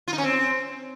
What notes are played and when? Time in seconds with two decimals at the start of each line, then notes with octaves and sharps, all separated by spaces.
0.08 F4
0.13 D#4
0.18 C#4
0.23 C4